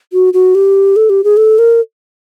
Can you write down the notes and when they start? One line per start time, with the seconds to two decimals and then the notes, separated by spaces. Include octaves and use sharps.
0.13 F#4
0.34 F#4
0.55 G4
0.96 A4
1.10 G4
1.24 G#4
1.37 A4
1.58 A#4